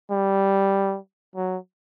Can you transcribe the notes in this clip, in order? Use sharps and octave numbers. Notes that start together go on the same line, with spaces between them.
G3
F#3